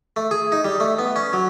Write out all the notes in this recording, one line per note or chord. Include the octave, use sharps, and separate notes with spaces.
A3
G#4
D#4
G3
A3
B3
C#4
F#3